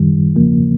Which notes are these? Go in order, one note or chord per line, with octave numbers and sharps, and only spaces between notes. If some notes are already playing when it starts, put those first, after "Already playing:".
Already playing: F#2 D#3 G3
E2 C#3 F3 A#3